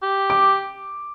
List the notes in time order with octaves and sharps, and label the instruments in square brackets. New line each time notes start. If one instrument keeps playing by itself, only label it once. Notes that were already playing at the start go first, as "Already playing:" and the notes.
[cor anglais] G4
[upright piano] D6